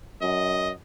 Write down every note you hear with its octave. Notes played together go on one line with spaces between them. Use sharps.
F#2 D#5